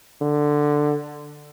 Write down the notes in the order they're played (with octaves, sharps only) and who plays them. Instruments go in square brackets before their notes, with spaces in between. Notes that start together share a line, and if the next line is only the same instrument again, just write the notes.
[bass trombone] D3